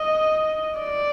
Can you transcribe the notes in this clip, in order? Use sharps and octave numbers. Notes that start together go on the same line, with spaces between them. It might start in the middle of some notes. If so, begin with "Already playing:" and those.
Already playing: D#5
D5